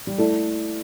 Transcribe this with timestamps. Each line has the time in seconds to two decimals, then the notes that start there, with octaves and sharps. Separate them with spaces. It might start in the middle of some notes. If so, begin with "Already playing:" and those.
0.07 G3
0.18 A3 E4 A4 D5